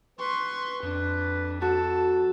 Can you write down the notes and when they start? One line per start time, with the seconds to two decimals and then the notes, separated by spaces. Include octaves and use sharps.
0.20 B4 C6 C#6
0.83 F2 D4
1.62 F#4 A4 A5